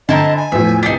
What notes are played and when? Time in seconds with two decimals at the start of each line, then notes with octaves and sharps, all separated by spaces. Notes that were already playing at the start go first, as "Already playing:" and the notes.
0.09 D3 C4 E4 D#5 A5 A#5
0.37 G#5
0.52 E2 A2 F3 E5
0.83 C2 D4 D#4 A6 B6